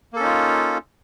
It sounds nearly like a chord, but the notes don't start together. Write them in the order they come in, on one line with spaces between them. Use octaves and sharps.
A#3 A4 C#4 D#4 F4